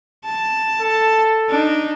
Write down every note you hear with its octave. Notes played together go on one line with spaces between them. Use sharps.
A5
A4
D4 D#4